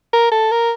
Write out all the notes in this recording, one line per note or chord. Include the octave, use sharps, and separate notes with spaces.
A#4
A4
A#4